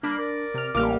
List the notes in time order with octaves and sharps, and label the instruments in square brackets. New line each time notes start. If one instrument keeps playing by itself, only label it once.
[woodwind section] G3 A#3 [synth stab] D4 [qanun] B5
[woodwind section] A#4 D5
[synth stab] C3 F6
[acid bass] A1 [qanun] G3 A#3 [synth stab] D6 F6